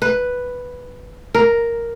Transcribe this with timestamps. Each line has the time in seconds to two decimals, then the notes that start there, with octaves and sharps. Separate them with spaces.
0.02 B4
1.35 A#4